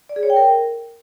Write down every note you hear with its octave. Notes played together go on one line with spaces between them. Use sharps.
D5
G#4
C#5
G5
A#4